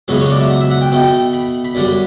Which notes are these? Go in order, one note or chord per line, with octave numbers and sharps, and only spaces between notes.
C#2 B2 F#3 A3 B4
C#5
D5
E5
F#5
E5
F#5
G5
B2 A3 G5
B5
B5
F#2 D3 G3